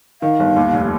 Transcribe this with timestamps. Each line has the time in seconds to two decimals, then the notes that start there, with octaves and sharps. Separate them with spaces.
0.22 D#3 F5
0.40 G1
0.56 D#2
0.73 F1